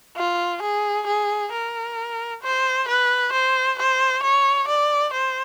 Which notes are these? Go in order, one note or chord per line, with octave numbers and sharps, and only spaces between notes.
F4
G#4
G#4
A#4
C5
B4
C5
C5
C#5
D5
C5